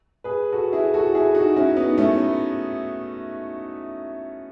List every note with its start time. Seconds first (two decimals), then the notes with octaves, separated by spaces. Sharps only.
0.24 G#4 B4
0.53 F#4 A4
0.73 E4 G#4
0.94 F#4 A4
1.15 E4 G#4
1.35 D#4 F#4
1.56 C#4 E4
1.77 B3 D#4
1.98 A3 C#4
2.18 B3